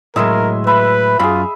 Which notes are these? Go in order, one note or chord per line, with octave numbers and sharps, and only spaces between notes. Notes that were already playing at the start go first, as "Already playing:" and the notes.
A2 F#3 G#3 A#4 D#5 E5 C6
B4 E5 B5
F#2 F4 G#4 E5 B5